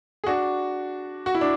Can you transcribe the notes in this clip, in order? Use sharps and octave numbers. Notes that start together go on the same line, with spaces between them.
G#4
D4 F#4
F#4
E4
D4